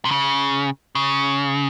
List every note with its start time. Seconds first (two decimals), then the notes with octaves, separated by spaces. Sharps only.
0.05 C3
0.11 C#3
0.95 C#3